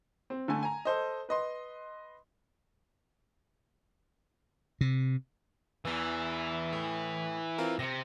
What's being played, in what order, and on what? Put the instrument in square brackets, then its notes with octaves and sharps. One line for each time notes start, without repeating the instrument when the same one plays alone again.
[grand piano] C4
D3 A3 G#5
G#5 A#5
A4 C5 D#5
B4 D#5 C6
[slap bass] C3
[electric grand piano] E2 E6 [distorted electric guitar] E3
[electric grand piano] A2
C4 F4 A#4
[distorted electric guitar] C3 C4 [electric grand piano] A#6 C#7